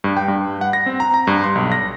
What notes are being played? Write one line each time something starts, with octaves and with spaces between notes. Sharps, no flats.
G2
G5
G2
F#5
A#6
C4
A#5
A#5
G2
C6
B1
A#6